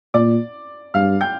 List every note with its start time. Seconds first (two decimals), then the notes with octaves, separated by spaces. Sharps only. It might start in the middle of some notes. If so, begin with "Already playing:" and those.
0.14 A#2 D5 D6
0.94 G2 F5 F6
1.21 G5 G6